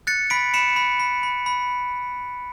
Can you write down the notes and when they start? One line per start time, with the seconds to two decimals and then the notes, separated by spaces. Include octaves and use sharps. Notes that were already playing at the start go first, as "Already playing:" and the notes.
0.07 F#6 A6 C#7
0.30 B5 B6 D7
0.54 B5 C#7 E7
0.76 B5
1.00 B5
1.23 B5
1.46 B5